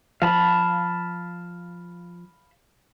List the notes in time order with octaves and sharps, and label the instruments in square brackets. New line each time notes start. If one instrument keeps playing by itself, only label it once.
[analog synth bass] F3 [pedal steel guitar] F5 A5 B5